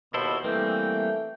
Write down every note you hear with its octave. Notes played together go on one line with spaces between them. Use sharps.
D#2 B2 E4 A4 C5
E3 G3 A3 A#3 C4 G5